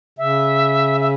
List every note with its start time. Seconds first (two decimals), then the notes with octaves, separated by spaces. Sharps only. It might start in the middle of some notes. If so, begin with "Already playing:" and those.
0.18 C#3 E5
1.01 E5